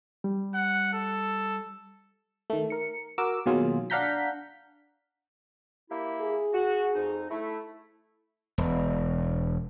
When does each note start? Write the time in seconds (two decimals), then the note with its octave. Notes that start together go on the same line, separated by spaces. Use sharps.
0.24 G3
0.55 F#5
0.93 A4
2.50 D#3 A3
2.70 A#4 C#7
3.18 F#4 A#4 D6 E6
3.46 B2 D#3 F#3 A#3 F4 G#4
3.90 D4 F5 F#5 A#5 G6 B6
5.90 A#3 E4 G4
6.21 G#4
6.54 F#4
6.96 F2 D#4
7.30 A3 E4
8.58 E1